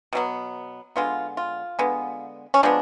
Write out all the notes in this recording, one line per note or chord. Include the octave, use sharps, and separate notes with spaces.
B2 F#3 B3
D3 G#3 B3 F4
F4
D3 G#3 B3
C#4
F3 G#3 B3 D4